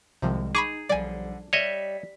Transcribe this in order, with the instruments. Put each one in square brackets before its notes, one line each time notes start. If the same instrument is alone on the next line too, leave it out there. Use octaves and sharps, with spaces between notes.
[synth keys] C2 D#3 G#3 [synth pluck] C3 F3
[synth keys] D#4 [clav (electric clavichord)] G#4 [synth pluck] B5 C#6 D6
[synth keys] B1 F3 G3 [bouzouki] D3 [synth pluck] D5 G#5
[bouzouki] G3 [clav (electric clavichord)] C#5 D#5 E5 [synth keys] B6